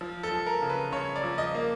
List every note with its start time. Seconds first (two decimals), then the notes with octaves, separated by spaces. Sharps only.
0.01 F3
0.23 A4
0.31 F3
0.46 A#4
0.62 C#3
0.70 B4
0.92 C#3 C#5
1.16 D5
1.24 F3
1.38 D#5
1.55 A#3